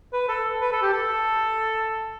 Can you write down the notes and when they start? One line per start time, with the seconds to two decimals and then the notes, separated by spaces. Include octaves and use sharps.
0.13 B4
0.29 A4
0.61 B4
0.72 A4
0.82 G4
0.93 A4